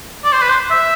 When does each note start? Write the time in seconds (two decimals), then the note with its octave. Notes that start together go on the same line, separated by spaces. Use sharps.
0.24 D5
0.33 C5
0.42 B4
0.50 C5
0.71 E5